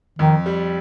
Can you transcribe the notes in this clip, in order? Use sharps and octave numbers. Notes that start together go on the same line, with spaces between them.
F2 D#3
G3